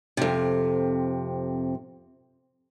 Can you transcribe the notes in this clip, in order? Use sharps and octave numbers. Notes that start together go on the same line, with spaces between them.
F2 C3